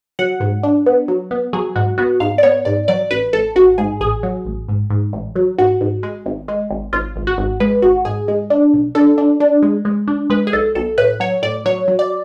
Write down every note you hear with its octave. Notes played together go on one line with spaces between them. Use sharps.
F#3 F#5
G#2
D4
B3
F#3
B3
F#3 G#4
G#2 F#4
B3 F#4
G#2 F5
D5
B3 C#5
G#2 D5
F#3 D5
A1 B4
A1 A4
A1 F#4
G#2 G#4
A1 G#4
F#3
A1
G#2
G#2
A1
F#3
G#1 F#4
G#1
G#3
G#1
G#3
G#1
G#1 F4
G#1
F#4
G#1
G#3 B4
G#1 F#4
G#2 G#4
G#3
D4
B1
D4 A4
D4
D4
G#3
G#3
D4
G#3 B4
G#4
B1 A4
B1 A4
A2 B4
F#3 C#5
A2 D5
F#3 C#5
F#3
D5